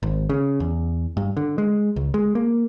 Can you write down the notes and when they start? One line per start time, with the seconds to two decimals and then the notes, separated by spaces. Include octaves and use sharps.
0.03 G#1
0.29 C#3
0.60 E2
1.17 G2
1.37 D3
1.58 G#3
1.96 C#2
2.14 G#3
2.35 A#3